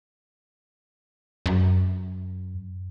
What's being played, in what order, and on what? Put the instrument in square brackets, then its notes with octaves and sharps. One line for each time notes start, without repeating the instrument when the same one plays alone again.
[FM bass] F#2